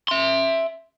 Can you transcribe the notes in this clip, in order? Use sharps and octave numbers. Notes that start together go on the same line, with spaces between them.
E5 C6